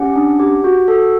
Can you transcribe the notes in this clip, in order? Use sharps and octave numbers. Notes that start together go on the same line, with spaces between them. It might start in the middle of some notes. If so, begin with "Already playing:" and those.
Already playing: C#4 G4 F#5
D4
G4
F#4
A4